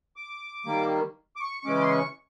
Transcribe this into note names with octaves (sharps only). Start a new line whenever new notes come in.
D6
D#3 G3 A#3
D6
C#6
C#6
C#3 E3 G#3 C#4 D6
C6
C#6